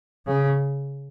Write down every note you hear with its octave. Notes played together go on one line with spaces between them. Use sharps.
C#3